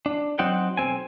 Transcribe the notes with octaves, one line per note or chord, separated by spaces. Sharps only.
D4
F#3 C4 D#4 F#5 G5
B1 F#3 C4 G#5